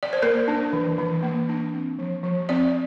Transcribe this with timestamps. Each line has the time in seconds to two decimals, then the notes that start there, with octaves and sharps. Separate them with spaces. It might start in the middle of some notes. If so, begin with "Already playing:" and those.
0.03 D5
0.13 C5
0.22 A#3 A#4
0.48 D4
0.73 E3
0.98 E3
1.23 A#3
1.49 D4
1.74 C4
1.99 F3
2.24 F3
2.49 C4 D5